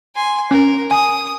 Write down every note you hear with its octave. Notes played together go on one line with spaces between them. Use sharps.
G#5 C6
C#4 A#4
G#5 D#6